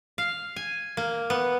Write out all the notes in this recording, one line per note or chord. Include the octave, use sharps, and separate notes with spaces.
F5
G#5
A#3
B3